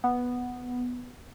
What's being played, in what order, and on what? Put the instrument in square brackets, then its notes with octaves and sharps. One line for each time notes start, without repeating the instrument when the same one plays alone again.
[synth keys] B3